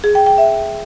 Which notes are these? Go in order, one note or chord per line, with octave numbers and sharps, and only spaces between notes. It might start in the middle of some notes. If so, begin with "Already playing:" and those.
G#4
G5
G5
E5